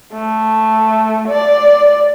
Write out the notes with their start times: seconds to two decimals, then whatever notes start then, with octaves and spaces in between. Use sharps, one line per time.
0.13 A3
1.28 D5